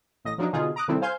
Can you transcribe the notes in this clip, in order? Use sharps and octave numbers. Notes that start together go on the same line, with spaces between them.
A1 D#5 A#6
F3 F#3 D4 D#4
B2 D3 D#4 F4 G#4
A#5 D6 D#6 F#6
C3 D#3 G3 A3 C4 E4
C5 F5 G#5 C6 G6